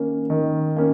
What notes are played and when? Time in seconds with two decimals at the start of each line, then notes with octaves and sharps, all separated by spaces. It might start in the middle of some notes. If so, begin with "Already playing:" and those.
Already playing: D#3 A#3 C#4
0.30 D#3
0.76 A#3 C#4